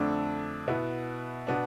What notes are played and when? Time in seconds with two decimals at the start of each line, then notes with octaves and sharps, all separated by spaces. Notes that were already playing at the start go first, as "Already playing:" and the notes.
Already playing: F2 D3 A3 D4
0.68 B2 B3 E4
1.47 B2 B3 D4